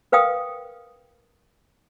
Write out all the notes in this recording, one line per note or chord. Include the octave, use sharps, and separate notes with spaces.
A#4 B4 F5 G5 D#6